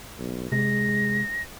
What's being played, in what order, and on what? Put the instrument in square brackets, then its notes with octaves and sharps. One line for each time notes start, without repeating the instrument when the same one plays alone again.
[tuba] B1
[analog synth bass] C3 [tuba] G#3 [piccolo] A#6